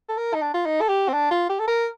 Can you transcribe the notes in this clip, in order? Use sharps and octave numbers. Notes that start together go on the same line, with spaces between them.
A4
A#4
D#4
D4
F4
D#4
A4
G4
C4
D4
F4
G4
A4
A#4